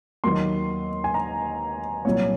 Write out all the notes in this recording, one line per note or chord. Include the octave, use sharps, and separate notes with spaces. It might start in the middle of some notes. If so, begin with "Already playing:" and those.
D#2 D#3 F#3 A#3 C6
G#5
A#5
C2 A#2 F#3 C#5